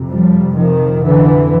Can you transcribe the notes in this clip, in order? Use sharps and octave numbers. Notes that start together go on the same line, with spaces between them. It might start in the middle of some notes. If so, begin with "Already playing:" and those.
Already playing: F2 C3
F3 G3
D#3 F3
D3 E3